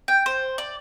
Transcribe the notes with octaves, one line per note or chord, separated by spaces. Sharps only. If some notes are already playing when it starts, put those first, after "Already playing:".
G5
C5
D5